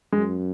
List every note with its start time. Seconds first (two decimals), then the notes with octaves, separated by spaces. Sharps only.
0.12 F#2 G#3